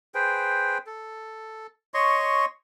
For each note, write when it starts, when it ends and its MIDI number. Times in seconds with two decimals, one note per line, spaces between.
0.15 0.78 68
0.15 0.78 71
0.15 0.78 72
0.15 0.78 79
0.87 1.67 69
1.94 2.46 73
1.94 2.46 75
1.94 2.46 84
1.94 2.46 85